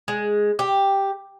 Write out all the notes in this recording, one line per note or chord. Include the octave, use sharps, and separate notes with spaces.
G#3
G4